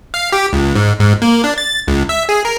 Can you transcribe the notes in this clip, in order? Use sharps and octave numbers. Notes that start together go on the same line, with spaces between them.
F5
G4
C#2
G#2
G#2
A#3
D4
A6
C#2
E5
G#4
A#4